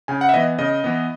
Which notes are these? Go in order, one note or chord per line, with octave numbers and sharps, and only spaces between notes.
C#3 G#5
F#5
E5
E3 B3 D#5
C#3 D#5
E3 B3